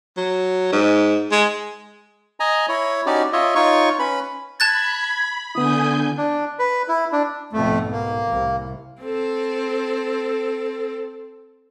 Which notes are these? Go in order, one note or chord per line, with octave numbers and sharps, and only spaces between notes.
F#3
G#2
G#3
D#5 G#5 A#5
E4 C#5
C#4 D#4 F#4 G4 D5
F4 C#5 D#5 E5
D#4 F4 C#5 C#6
C#4 B4 B5
A5 B5 F#6 G#6 A6
D3 B3 E4 G#5 D#6 G6
D4
B4
E4
D4
B1 F2 G#2 B2 A3
A#3
C2 A2 C3
C4 A4